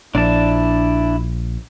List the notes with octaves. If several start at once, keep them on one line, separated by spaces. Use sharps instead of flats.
A#1 D4 E4 D5 A5